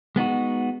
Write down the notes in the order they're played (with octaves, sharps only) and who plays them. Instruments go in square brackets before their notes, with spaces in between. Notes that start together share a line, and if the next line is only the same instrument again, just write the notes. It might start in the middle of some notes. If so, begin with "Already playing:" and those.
[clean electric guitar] G#3 B3 D#4 F#4